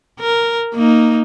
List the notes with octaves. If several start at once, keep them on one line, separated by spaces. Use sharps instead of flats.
A#4
A#3 D#4